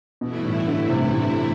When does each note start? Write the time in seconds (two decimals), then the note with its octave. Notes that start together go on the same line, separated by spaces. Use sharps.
0.21 G2 B2 E3 A3 E4
0.45 A2
0.67 D3
0.90 C3
1.13 A2